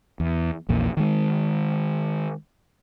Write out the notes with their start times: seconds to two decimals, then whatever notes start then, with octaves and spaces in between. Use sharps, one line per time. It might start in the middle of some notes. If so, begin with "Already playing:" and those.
0.20 E2
0.69 A#1 E2 A#2
0.97 D#3 G#3